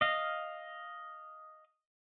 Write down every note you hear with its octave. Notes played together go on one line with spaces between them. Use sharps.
D#5 F5